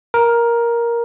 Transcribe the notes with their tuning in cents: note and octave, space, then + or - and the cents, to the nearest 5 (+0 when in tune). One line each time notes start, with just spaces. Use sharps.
A#4 +10